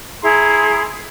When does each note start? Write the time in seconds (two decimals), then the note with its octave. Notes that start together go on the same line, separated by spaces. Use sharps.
0.22 E4 G#4 A#5 C6